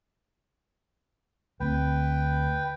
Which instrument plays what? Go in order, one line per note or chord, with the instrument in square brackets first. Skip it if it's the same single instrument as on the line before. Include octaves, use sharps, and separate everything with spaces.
[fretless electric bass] D2 A#3 C4 [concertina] B4 G5